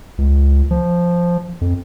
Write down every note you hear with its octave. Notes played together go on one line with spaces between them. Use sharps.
C#2
F3
F2